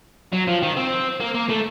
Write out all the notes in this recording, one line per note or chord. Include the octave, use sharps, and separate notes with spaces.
F#3
F3
D#3
C4
A#3
A#3
A3